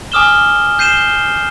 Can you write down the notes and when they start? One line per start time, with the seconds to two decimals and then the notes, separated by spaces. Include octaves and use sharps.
0.12 G#5 D6 D#6 F6 E7 G7
0.79 G6 C7 D#7 E7 G7